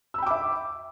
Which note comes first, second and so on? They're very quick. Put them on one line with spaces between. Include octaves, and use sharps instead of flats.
E6 B5 G5 D6 E5